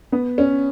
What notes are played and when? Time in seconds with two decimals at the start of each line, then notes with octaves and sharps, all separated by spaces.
0.12 B3
0.38 C#4